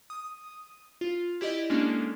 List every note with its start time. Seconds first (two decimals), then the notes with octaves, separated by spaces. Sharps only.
0.10 D#6
1.01 F4
1.41 E4 G4 D5 D#5
1.70 G#3 A#3 C#4 D4 A4